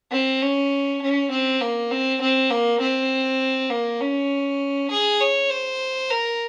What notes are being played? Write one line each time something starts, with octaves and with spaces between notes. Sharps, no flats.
C4
C#4
C#4
C4
A#3
C4
C4
A#3
C4
A#3
C#4
G#4
C#5
C5
A#4